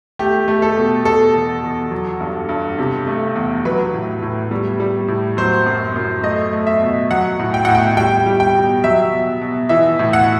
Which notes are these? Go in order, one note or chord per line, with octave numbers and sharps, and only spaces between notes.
A3 G4
A3
A4
B2
B2 A4
E2
E2
F#3
G2
G2
C3
A3
E2
F#3 B4
A2
A2
G3
G3
A2
F#3 C5
F#2
F#2
A3 D#5
A3
E5
B2
F#3 F#5
A2
G5
A2 F#5
G5
G3 G5
G3
G5
B2
F#3 E5
B2
B2
E3 E5
A2
F#5